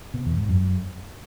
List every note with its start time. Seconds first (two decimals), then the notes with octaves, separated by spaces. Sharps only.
0.14 B2
0.26 E2
0.37 G#2
0.49 F#2